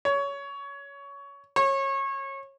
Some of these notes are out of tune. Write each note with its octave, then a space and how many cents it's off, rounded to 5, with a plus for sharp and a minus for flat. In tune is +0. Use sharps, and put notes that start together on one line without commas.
C#5 +20
C#5 -25